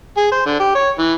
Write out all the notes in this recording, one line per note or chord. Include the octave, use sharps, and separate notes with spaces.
G#4
C5
D3
G4
C#5
E3